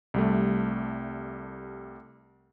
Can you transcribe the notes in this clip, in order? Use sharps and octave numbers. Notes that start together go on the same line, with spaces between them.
C2 G3 A3